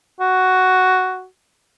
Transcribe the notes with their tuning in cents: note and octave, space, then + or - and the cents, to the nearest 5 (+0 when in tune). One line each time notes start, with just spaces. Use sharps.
F#4 +5